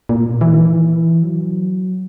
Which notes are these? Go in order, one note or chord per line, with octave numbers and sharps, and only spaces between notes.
A#2
E3
D#3
E3
F#3